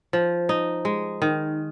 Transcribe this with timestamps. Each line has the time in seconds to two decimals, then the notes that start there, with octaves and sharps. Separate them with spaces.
0.13 F3
0.49 D#4
0.85 G#3
1.22 D#3